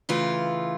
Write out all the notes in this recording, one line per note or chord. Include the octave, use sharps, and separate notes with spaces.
C#3 E3 A3 F4